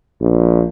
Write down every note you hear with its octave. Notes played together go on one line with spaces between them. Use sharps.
A#1